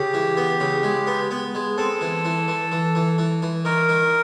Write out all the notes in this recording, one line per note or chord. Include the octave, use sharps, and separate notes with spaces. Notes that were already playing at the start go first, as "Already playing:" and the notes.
Already playing: C#3 G4
E3
B3
C#3
G#3
B3
B3
G#3
C4 A4
E3
E3
E3
E3
E3
E3
E3
D#3 A#4
D#3